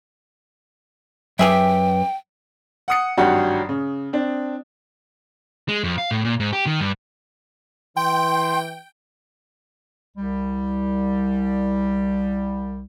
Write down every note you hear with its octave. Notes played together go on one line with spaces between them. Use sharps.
F#2 G4 G#4 B4 E5 G5
F#5 D#6 C#7
G#1 G2 F#3 F#4 G4 F#5
C#3
C4 D4
G#3
F2
F5
A2
A#2
G#2
G4
D#3
G2
E3 G5 C6
C2 G3